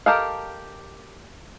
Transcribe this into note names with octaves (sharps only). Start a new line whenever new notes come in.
G4 A4 A#4 D#5 F5